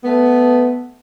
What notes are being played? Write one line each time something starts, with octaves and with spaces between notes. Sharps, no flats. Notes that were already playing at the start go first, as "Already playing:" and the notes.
A3 B3